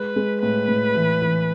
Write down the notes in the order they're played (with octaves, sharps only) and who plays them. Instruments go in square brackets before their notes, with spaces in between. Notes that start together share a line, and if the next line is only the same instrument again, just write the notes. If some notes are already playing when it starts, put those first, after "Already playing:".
Already playing: [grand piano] G#3 [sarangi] B4
[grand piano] G#3
[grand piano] A2 [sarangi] B4
[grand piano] A2
E3
E3